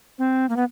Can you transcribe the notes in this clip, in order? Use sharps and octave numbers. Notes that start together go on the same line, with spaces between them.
C4
A#3
B3